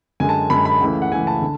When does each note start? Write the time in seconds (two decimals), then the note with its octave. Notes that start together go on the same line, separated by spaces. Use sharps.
0.20 F#2 D3 G#3 G#5
0.29 A5
0.50 F#2 D3 G#3 B5
0.65 B5
0.81 C#2 C#3 E3 A3
1.02 F#5
1.12 C#2 C#3 E3 A3 G#5
1.27 A5
1.41 D3